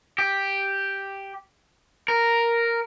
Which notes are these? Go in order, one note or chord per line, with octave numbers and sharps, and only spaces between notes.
G4
A#4